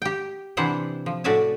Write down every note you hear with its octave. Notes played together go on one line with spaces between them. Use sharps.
G4 G5
C3 E3 D4 E4 C5 F#5
F3
A2 F#4 D5 E5 G#5 A5